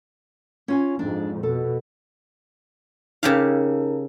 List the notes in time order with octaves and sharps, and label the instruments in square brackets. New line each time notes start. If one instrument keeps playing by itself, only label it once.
[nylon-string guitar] C#4 F4 G#5
[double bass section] F2 G#2 [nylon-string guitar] D4
[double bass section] B2 [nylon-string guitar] A4
[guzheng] C#3 G4 F5 [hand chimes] D#4 A#4